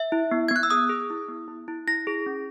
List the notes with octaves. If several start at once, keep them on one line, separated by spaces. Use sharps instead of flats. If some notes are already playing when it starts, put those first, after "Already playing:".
Already playing: E5
E4
B3
G#6
B3 F#6
E6
G#4 D#6
G#4
E4
B3
E4
E4
E4 A#6
G#4
C#4